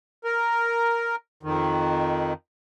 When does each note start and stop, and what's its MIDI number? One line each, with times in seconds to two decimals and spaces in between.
0.24 1.16 70
1.43 2.33 41
1.43 2.33 51